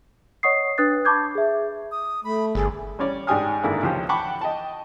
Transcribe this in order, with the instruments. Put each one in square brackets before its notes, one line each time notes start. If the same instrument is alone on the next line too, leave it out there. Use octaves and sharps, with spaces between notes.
[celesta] C#5 D#5 F#5 C#6 D#6 C7
D4 B4 D#6 F#6 A6
A5 B5 C#6 D6 G6 G#6
G#4 E5
[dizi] D#6
[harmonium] A3 [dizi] B5
[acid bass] G1 [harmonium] G#4 [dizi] A4
[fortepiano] G3 C#4 C#5 D5
G#2 D4 G4 G#5 D#6 F6
G#1 G#2 D3 A#3 E4 D5
C#2 F3 C#4 G4 C5
F#5 G5 A5 B5 C#6 D6
D#5 G5 A5